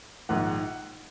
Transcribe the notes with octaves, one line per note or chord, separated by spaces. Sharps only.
A#1 G#2 D#3 F#5